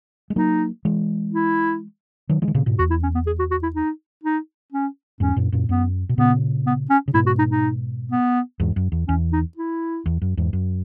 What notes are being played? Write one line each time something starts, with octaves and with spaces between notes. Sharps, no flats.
G#3
F#3 A#3 D#4
E3 G#3
E4
D#3 F#3
E3 G#3
D#3
A#2 C#3
G#2 B2
E2 F#4
E4
C#4
B3
G#4
F#4
F#4
E4
D#4
D#4
C#4
E2 G#2 C#4
F#2 A#2
F#2 A#2
F#2 B3
B2
A#2 C#3 B3
B3
C#4
C#3
G#2 B2 E4
F#4
D#4
D#4
B3
E2 G#2
F#2
E2
E2 C#4
D#4
E4
E2
F#2
E2 G#2
F#2